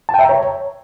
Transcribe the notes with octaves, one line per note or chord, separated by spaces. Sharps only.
A5
G5
E5
A#5
C#5